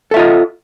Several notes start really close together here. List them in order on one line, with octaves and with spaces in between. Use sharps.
A4 E5 F4 D#5